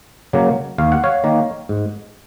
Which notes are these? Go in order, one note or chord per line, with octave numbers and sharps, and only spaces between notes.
C#3 F#3 A#3
D#2 F5
F#5
C#5 F5
D#3 A#3
G#2